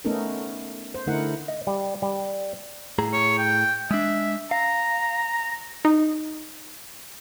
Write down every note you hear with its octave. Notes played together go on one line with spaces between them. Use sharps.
A3 B3 C#4 D#4 A4 A#4
C5
D3 A3 D#4 E4 A#4 F#5
D#5
G3
G3
A2 G#4 A#5
C#5
G5
G#3 D4 E5
F5 A#5
D#4